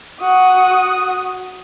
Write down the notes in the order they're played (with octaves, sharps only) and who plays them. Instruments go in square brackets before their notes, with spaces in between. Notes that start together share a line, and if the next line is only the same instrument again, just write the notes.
[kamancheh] F#4 D#6